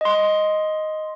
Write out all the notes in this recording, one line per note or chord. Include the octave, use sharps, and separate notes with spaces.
D#5 C6